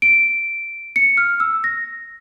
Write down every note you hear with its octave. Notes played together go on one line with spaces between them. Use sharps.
D7
C#7
F6
E6
A#6